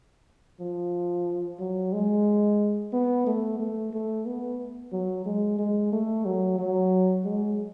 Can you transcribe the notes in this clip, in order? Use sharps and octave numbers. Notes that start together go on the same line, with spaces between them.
F3
F#3
G#3
B3
A3
A3
A3
B3
F#3
G#3
G#3
A3
F#3
F#3
G#3